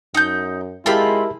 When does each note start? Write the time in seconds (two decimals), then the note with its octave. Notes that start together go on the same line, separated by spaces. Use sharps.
0.15 F#2 D#4 G6
0.86 G#3 C4 E4 F4 G4 A#4 A5 B5